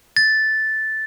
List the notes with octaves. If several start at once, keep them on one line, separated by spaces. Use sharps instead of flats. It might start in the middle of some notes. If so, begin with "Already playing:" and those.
A6